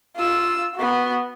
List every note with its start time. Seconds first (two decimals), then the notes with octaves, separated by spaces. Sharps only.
0.16 F4 E6
0.75 B3 F#4